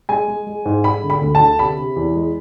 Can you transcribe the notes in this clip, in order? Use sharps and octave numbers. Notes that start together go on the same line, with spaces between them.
G#3 G#5
G#3
G#3
G#2
G#3 B5
D3
B5
D2
A5
D3
C3 B5
C3
E2
G#3